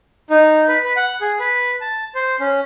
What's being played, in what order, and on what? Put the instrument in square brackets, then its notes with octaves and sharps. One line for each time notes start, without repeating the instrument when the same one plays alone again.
[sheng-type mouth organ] D#4
B4
B4
F#5
G#4
B4
A5
C5
C#4